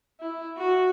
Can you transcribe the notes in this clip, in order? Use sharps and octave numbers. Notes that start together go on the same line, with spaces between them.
E4
F#4